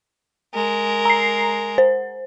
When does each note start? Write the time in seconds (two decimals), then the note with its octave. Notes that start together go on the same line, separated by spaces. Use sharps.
0.54 G#3 A#4
1.05 A#5 C7
1.78 C5